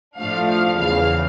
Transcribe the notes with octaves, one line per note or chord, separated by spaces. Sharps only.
A2 F3 A3 D4 F5
F5
E2 C#3 E3 F5